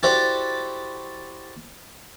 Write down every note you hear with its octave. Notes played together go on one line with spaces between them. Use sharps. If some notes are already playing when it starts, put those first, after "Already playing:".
E4 F#4 G4 A4 C5 D5